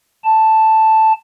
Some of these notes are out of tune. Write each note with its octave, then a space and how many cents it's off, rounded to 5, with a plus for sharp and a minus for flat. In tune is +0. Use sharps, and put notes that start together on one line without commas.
A5 +0